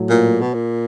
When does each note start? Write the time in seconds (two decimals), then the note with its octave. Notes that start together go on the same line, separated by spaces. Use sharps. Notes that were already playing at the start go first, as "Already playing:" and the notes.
Already playing: A2 F#3 A3
0.10 A#2
0.41 B2
0.54 A#2